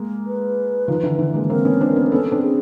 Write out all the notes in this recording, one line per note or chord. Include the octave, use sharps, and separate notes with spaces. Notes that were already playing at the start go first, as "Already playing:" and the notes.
Already playing: G#3 A#3
B4
D#3 F3
D3 E3
D3 E3
G#3 A#3
A#3 C4 A#4
B3 C#4
C4 D4
B3 C#4
B3 C#4 A4
C4 D4
G#4